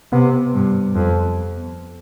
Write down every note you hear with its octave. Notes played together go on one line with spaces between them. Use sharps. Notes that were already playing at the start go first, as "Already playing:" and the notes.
C3 B3
G2
F2